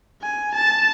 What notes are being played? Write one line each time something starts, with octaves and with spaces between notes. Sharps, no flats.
G#5
A5